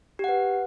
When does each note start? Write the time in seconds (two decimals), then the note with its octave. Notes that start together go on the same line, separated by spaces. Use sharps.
0.19 G4
0.24 F#5
0.29 B4